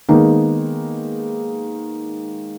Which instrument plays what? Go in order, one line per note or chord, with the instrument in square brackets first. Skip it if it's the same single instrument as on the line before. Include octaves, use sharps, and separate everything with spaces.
[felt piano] D#3 G#3 A#3 B3 D#4